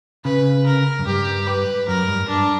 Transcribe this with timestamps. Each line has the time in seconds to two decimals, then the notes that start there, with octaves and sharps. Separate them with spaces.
0.25 C#3 B4
0.66 A#4
0.99 F#2
1.06 G2 G4
1.47 B4
1.88 F#2 A#4
2.08 G2
2.28 G2 D4